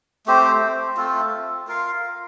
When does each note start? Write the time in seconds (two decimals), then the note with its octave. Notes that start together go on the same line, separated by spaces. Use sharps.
0.26 A3 C4 G4 C5
0.97 A3 C4 F4 A4
1.67 F4 A#4 F5